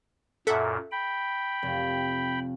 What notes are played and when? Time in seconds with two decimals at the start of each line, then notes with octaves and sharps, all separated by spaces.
0.47 F#2 A#2 A4 E5 F#5
0.92 G5 B5
1.63 F1